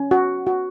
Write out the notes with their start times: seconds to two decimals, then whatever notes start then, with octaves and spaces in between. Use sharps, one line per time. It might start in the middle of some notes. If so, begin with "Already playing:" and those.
Already playing: C#4
0.11 F#4
0.47 F#4